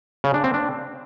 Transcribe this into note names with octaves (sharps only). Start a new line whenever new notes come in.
C#3
D4
C4
D4